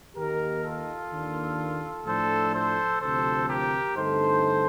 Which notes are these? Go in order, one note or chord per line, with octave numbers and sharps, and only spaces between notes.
D#2 D#3 A#3 D#4 G4 A#4
F4 A4
D#2 D#3 A#3 D4
A2 F3 A3 D4 A4 C5
A4 C5
D2 C3 F3 A4 C5
G4 A#4
G2 D3 A3 C4 D#4 A4 C5